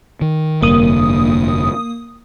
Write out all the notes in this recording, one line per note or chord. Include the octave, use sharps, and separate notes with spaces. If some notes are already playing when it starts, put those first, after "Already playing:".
D#3
F1 G2 D3 A#3 D#6